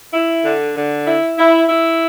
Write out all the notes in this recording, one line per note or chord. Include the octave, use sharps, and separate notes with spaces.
E4
D3
D3
E4
E4
E4